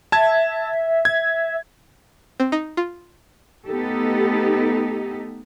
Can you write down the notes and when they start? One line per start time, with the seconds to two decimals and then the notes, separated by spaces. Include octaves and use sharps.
0.12 E5 A5 G#6
1.05 G#6
2.40 C4
2.52 D#4
2.77 F4
3.67 A3 B3 D#4 G4 A4